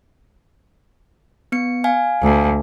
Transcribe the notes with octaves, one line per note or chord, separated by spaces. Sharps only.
B3 C#7
F5 G#5
D2